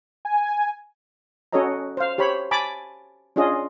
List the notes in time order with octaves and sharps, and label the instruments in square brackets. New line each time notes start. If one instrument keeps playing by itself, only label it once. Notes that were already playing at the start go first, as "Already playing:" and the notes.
[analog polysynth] G#5
[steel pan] C#4 F#4 A4 C#5 D#5 A#5
C5 F5
G4 C5 C#5 B5
G#5 A5 B5 D6
C#4 D4 F4 G#4 D#5